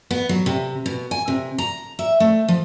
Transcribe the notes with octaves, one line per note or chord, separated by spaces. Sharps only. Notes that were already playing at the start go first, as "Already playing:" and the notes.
B3
F#3
C3
B2
G#5
C3
A#5
E5
A3
F3